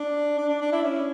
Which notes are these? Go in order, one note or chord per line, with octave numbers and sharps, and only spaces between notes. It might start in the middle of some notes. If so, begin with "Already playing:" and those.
Already playing: D4
D4
D4
D4
E4
C#4